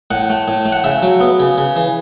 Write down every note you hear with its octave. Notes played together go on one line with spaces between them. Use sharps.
A2 F#5
A3
A2
A3
F#5
C#3 E5
F#3
B3
C#3
C#3
E3